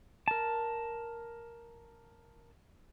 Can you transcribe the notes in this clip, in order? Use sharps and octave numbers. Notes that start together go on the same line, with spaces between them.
A#4 A5